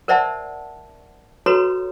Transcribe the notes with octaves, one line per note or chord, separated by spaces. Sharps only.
A#4 C5 D5 E5 F#5 A5
F#4 A4 B4 C#5 A#5 C6